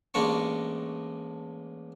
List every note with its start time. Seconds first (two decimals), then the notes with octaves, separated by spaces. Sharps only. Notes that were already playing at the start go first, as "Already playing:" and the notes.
0.14 A1 G#3 A#3 D4 C#6